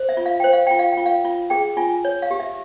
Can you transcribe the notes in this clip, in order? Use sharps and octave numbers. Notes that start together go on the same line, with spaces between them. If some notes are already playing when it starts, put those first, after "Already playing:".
Already playing: C5
E5
F4
F5
C5 G5
F5
F4 G5
F5
F4 G5
F5
F4
G#4 G5
F4 G#5
C#5
F5
G4
E5